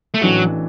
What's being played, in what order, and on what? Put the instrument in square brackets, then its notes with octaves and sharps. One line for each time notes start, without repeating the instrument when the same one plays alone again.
[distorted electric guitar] A3
[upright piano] A1 A2 E3 D4 F#4 [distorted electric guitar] F#3